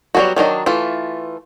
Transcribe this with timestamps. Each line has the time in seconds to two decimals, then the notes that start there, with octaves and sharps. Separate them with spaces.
0.15 F#3 G3 A#3 B3 F#4
0.36 D#3 F#3 D4 D#5
0.66 E3 A3 F4